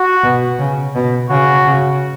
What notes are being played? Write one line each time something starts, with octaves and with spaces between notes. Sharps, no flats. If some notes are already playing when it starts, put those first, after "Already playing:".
Already playing: F#4
B2
C#3
B2
C#3 F#4
C#3